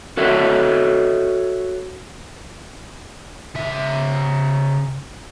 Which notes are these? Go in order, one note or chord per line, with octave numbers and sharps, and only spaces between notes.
F#4 A4 C#5 E5
C#3 E5